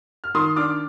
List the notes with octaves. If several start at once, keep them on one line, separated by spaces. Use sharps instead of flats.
F6
D#3 C6 D#6
D4 D6 F6